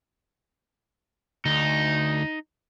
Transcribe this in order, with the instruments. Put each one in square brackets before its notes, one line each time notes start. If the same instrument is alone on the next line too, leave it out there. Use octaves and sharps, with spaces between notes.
[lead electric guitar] D2 [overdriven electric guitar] D#4